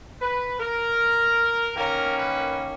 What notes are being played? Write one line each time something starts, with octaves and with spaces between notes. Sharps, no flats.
B4
A#4
D#3 A#3 C#4 A#4
B4